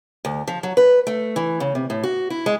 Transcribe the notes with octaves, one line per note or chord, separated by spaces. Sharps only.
D2
F3
F#3
B4
A3
E3
C#3
C3
A2
F#4
E4
G#3